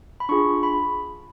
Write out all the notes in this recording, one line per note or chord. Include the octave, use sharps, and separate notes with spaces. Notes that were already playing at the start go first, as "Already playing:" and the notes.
B5
D4 F4 G#4 C#6
B5